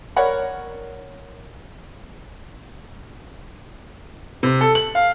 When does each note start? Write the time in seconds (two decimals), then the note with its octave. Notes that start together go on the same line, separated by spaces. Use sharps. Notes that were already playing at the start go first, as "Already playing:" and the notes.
0.16 A#4 C#5 D5 F#5 B5
4.43 C3
4.61 A4
4.75 F#7
4.95 F5